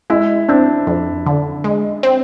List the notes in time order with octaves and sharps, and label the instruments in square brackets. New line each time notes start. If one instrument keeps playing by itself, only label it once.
[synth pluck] G#3 [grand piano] E4
[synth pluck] C4 [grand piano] D4
[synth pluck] F2
D3
G#3
C4